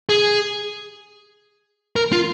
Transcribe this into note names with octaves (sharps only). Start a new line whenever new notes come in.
G#4
A#4
F4